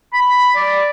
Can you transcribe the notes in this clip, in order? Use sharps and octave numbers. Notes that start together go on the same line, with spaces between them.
B5
D5